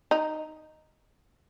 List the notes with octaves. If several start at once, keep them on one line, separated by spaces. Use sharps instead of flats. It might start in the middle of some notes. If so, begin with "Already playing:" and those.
D#4